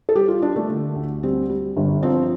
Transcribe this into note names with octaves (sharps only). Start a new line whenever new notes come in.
A4
G3 G4
F4
G3 D4
A3
D3
D2
G3 C4
G3
G1
F3 C4